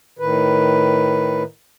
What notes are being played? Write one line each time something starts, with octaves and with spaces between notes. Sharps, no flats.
A2 D#3 B4